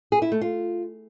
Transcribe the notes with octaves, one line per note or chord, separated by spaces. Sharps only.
G#4
E4
A3
F4